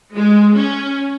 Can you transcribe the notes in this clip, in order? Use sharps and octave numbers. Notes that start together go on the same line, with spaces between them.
G#3
C#4